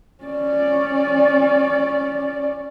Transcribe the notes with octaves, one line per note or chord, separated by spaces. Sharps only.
C#4 D5